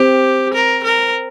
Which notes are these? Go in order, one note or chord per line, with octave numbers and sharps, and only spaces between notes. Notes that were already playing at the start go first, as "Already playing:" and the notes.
Already playing: C4 G4
A#4
A#4